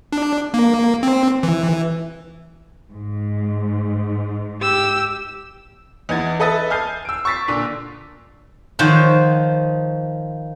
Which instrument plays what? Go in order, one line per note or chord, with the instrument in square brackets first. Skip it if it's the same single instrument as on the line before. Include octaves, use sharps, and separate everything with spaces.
[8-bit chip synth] D4
A#3
C4
E3
[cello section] G#2
[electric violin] G4 E6
[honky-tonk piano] E2 D#4 F#5 G#6 A6
A4 B4 D#5 E5 A6
G#5 A5 F6 G6 C7
E6 D7
C#6 E6 A6 B6 C7
A#2 D3 D4
[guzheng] D#3 F3 C5 C#5 F#5